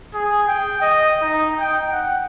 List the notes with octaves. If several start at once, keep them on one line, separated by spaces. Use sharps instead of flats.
G#4
G5
D#5
D#4
G5
F#5